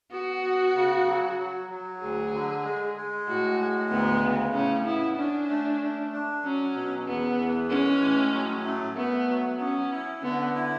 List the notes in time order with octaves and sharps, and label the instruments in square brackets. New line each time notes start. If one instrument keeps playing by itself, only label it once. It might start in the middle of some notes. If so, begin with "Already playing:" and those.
[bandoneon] B3 [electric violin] F#4
[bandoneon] B3
C#3
F#3
F#3
F#3
[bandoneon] D2 [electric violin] G#4
[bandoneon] D3
G#3
G#3
[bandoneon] A2 [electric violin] F#4
[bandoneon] G#3
[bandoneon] D2 [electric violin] B3
[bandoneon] C#3
[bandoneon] A2 [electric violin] C#4
[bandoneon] B3 [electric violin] E4
[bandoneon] C#4 [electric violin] D4
[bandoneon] A3
A3
D4
[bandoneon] F#3 [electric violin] C#4
[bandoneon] B2
[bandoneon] E2 [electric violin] B3
[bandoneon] E3
[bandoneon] G#3 [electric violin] C#4
[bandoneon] A2
F#3
A3
[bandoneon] A3 [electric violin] B3
[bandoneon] F#3
[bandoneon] B3 [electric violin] C#4
[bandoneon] E4
[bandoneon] D3 [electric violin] B3
[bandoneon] E4